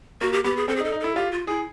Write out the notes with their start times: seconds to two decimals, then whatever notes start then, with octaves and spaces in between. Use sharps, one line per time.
0.21 A#3 F#4
0.33 G4
0.44 B3 G4
0.57 G#4
0.68 C4 A4
0.76 G#4
0.80 D#4
0.85 A4
0.92 D#4
1.00 E4 A4
1.16 F4 G4
1.32 F4
1.47 E4 G#4